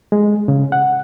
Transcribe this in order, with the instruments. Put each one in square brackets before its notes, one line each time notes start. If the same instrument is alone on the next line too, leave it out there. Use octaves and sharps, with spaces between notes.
[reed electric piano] G#3
C#3
F#5